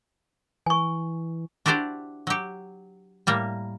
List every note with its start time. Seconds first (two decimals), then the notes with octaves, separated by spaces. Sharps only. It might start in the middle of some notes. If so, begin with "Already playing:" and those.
0.66 E3 G#5 C#6
1.66 D4 E4 F#4 G4 C5 D5
2.27 F#3 G4
3.27 A2 G3 A#3